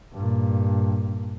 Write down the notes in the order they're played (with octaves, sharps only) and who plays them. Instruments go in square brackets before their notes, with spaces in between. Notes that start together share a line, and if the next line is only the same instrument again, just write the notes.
[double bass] G2 A#2